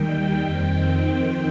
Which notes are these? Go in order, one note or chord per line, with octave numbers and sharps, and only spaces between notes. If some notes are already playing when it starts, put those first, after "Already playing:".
Already playing: D#2 D#3 G3 G5
F2 D#3 C4 G5